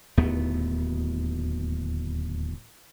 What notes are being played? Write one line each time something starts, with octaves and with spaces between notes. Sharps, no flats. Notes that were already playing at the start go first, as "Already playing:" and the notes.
D1 D#2 A3 B3